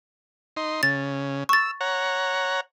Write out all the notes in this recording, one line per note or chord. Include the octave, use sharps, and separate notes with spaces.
D#4 C6
C#3 A6
C#6 E6 A6
C#5 F#5 A#5